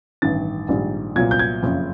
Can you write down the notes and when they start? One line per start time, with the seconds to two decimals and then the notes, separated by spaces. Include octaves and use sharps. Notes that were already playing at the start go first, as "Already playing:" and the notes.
0.22 A1 G2 D#3 A6
0.68 A#1 G#2 D#3 G3
1.15 C2 A#2 F#3 B3 G#6
1.31 G6
1.39 G#6
1.63 F#1 F2 C#3